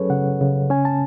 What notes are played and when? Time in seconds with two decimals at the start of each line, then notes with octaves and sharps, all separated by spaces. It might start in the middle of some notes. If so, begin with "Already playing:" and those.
Already playing: F#3 C#4 G#4 A4 B4 C#5
0.10 C#3 F#5
0.41 C#3
0.70 C#4 G#5
0.85 A5